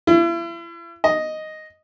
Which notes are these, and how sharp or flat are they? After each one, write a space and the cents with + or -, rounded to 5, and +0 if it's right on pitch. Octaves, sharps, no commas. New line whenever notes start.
E4 +40
D#5 +0